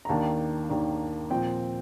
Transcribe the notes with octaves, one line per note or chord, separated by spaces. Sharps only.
A#5
D#2 D#3 A#3 D4 A5
D#2 D#3 A#3 D4
A#2 F3 C4 G5